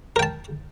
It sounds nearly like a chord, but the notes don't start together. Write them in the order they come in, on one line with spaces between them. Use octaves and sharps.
A#4 G5 A5